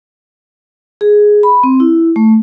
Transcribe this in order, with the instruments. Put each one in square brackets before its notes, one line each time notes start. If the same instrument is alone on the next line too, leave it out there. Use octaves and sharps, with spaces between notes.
[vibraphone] G#4
B5
C4
E4
A3